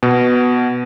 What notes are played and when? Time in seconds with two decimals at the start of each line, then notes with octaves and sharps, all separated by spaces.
0.03 B2